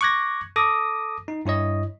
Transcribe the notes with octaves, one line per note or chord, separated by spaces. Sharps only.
C#6 D6 F#6 G#6 A#6
A4 D6 D#6 A#6
D#4
G2 E4 C#5 D#5